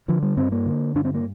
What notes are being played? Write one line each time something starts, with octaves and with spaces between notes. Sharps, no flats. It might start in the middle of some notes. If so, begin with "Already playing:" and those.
D3 F3
G3
G2 C4
A#3
D3
G2 D4
C4
A#3